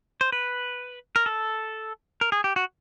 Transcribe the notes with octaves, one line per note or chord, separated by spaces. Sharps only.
C5
B4
A#4
A4
A#4
G#4
G4
F#4